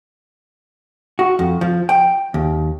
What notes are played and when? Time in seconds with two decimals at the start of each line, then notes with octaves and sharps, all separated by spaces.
1.19 F#4
1.39 F2
1.61 F3
1.89 G5
2.34 D#2